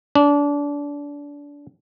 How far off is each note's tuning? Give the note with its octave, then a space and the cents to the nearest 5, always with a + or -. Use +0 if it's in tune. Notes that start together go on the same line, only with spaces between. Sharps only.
D4 -25